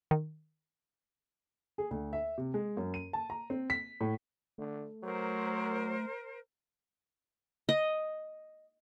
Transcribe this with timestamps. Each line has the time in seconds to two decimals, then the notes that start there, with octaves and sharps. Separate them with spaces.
0.11 D#3
1.78 G#4
1.91 D2
2.13 E5
2.38 C3
2.54 G#3
2.77 F#2
2.94 D#7
3.13 A5
3.30 A#5
3.50 C4
3.70 B6
4.01 A2
4.58 D3 A3
5.03 F#3 A#4 C5
7.69 D#5